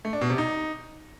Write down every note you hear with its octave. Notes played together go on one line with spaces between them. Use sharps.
A3
D4
B2
C3
D#4